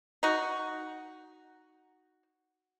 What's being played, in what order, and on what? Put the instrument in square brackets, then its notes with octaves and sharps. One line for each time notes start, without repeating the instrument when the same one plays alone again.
[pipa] D#4 F#4